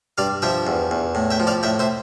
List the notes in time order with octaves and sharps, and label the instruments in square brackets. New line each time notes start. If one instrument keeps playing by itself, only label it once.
[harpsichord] G2 D5 F5
F3 E5 G5
E2
E2
A2
E5 G5
F3
D5 F5
A2 E5 G5
C5 E5